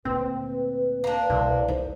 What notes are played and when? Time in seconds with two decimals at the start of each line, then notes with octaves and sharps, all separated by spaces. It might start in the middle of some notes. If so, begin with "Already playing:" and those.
0.05 D2 A#2 C4 B4
1.04 A#3 D4
1.30 C2 B2
1.68 D#4 C5